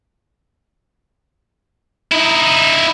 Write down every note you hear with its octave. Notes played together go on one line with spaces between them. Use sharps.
D#4 E4